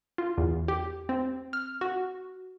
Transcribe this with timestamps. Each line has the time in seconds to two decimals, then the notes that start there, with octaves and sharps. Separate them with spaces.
0.18 F4
0.38 E2
0.68 G4
1.09 C4
1.53 F6
1.81 F#4